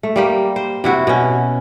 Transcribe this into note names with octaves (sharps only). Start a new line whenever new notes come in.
A3
G3 A#3 G4
C5
C3 E4 F#4
B2 C#4